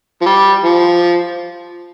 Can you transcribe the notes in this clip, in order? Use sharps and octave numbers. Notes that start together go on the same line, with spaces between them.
F3
G3
F3